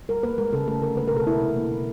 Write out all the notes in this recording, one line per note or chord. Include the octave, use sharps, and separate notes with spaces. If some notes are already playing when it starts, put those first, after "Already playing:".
G3 A#4
A#3 B4
G#3 A#4
C#3 A4
A3 A4
D3 A#4
A#3 B4
A#4
B2
A4
G#3 E4
C3
A#3
B2